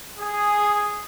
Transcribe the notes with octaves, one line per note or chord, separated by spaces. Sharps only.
G#4